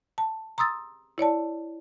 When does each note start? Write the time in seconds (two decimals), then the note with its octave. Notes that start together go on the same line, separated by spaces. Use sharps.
0.18 A5
0.58 A#5 C6 D#6 E6 A6
1.18 E4 C#5 D5 A5